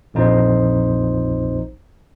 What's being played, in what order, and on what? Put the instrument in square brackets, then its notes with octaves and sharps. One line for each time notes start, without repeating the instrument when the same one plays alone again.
[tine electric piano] A#1 F2 D#4 C5